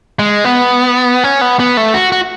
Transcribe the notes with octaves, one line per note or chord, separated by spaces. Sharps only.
G#3
B3
C#4
B3
B3
A3
F#4
F#4